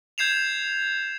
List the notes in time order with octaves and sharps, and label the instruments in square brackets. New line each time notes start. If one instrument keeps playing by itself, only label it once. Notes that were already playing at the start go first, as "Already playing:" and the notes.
[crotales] G6 G#6 C7 E7 F7